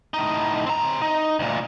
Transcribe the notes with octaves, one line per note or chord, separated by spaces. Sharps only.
A2 D#4
C4 A#5
D#4
D2 A#2